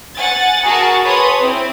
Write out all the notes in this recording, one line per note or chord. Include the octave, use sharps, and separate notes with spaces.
F#5 G#5 A6
F#4 G#4 A#4 A5
G#4 B4 C#5 A5 C6 D#6
C4 E4